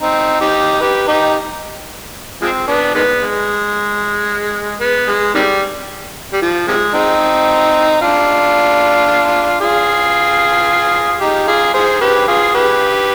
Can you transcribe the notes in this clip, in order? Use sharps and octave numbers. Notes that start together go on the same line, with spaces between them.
C4 D#4
D#4 G4
G4 B4
D#4 G4
F3 G#3 C4
B3 D4
D#3 G#3 B3
G#3
B3
G#3
C3 D#3 G3
G3
F3
C3 F3 G#3
C4 D#4
D4 F4
F4 G#4
D#4 G4
F4 G#4
G#4 C5
G4 B4
F4 G#4
G4 B4